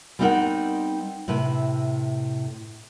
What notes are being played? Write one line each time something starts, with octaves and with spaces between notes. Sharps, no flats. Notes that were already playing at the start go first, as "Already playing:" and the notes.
G3 B3 C4 D#4 A#4 F#5
A2 C3 E4 B4